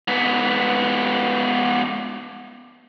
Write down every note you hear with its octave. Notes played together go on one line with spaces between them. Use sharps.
G#2 B3